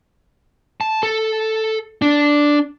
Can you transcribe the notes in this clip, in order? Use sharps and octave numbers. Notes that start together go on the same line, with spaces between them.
A5
A4
D4